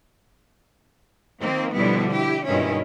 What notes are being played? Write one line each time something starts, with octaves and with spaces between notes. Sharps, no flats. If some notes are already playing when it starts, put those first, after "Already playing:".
D#3 F3 A#3 C4
B2 D3 F3 G3 B3 E4
E4 G4
G2 B2 D#3 G#3 C#4 E4